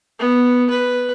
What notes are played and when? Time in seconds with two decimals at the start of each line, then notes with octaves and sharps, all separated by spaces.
0.19 B3
0.70 B4